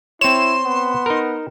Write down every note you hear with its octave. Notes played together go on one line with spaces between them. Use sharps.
C4 E4 C#5 C6 E7
B3
D#4 A#4